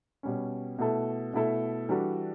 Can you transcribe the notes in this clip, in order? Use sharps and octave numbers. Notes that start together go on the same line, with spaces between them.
B2 G3 C#4
B2 A3 E4 A4
B2 A3 E4 A4
E3 G3 D4 F#4 A4